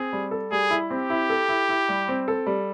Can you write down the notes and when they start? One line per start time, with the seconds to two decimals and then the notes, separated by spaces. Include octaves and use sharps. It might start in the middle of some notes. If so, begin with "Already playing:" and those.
Already playing: C4 G#4
0.13 G3
0.31 A4
0.51 G3 G#4
0.71 E4
0.90 C4 G4
1.10 E4
1.30 A4
1.49 E4
1.69 E4
1.89 G3
2.08 C4
2.28 A4
2.47 G3